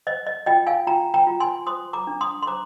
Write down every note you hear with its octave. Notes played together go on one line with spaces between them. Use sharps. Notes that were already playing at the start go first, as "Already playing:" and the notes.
C5 D#5
D#5
F4 D#5 G5
F5 G#5
F4 G5 A#5
G5 A#5
F4
G#5 C6
C5 C6 D#6
A#5 D6
D4
C6 D#6
C6
C5 A#5 D6